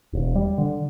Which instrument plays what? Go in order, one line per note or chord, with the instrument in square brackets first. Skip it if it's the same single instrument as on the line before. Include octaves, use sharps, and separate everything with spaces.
[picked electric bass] E1
G3
D3